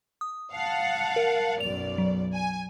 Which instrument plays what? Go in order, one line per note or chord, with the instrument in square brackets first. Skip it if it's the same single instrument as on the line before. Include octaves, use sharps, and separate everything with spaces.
[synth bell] D#6
[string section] F5 F#5 A5
[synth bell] A#4
[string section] B1 F#2 D5 [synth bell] F7
[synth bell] F#3
[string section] G#5